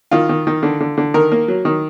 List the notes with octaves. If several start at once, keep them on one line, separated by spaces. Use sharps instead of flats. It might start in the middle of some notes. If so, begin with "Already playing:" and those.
D#3 F4
D#3
D#3
D3
D3
D3
D#3 A#4
A#3
F#3
D#3